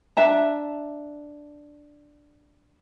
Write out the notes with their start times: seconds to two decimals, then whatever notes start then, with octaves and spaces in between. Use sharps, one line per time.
0.17 D4 E5 A5 A#5